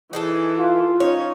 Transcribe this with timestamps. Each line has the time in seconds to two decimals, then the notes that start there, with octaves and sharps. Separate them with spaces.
0.13 E3 D#4 G#4 A4
0.59 F4
1.00 C#4 D#4 C#5